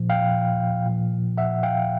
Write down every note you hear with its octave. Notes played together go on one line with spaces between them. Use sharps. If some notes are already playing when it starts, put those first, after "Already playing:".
Already playing: A#2 F3
F5 G5
A#2 F3
E5 F#5
F5 G5